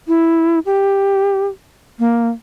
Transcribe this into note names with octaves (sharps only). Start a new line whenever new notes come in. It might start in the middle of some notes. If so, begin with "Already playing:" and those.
E4
G4
A#3